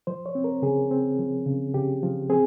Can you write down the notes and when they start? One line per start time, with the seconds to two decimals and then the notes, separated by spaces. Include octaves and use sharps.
0.07 F3 C5
0.26 C#5
0.35 C4
0.44 A#4
0.62 C#3 G#4
0.91 C4
1.19 F3
1.46 C#3
1.74 C#3 G4
2.03 F3
2.30 C4 G#4